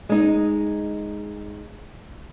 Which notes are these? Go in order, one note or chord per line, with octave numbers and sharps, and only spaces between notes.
G#3 D#4